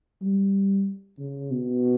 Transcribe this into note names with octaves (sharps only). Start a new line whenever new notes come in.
G3
C#3
B2